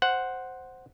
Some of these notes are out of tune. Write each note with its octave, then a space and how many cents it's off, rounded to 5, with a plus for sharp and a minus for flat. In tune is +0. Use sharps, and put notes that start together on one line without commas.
C5 +0 F#5 +0